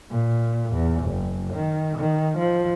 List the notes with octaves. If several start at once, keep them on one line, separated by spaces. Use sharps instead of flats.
A#2
E2
F#1
D#3
D#3
F3